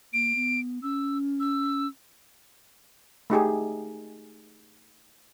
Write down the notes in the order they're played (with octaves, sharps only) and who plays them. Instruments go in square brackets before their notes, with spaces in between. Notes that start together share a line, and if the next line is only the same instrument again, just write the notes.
[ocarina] A#3 [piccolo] D7
[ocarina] B3
[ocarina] C#4 [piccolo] E6
[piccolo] E6
[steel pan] A3 D#4 G4 G#4